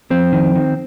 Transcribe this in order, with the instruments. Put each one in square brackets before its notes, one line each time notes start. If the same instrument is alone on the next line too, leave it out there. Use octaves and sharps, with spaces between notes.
[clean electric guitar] F2 C4
D#3
D#3